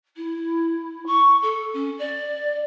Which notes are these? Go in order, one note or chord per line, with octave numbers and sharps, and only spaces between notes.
E4
C#6
A4
C#4
D5